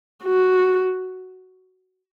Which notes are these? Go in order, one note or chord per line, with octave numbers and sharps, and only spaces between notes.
F#4